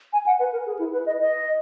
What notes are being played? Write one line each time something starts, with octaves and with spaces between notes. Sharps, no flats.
G#5
F#5
B4
A#4
G#4
E4
B4
D#5
D#5